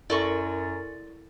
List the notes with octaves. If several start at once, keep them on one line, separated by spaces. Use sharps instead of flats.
F#2 E4 A4 A#4 D5 C6 C#6